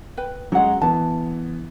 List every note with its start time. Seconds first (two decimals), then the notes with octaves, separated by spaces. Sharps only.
0.17 B4 G5
0.52 F#3 G#3 C#4 F#5
0.81 E3 B3 A5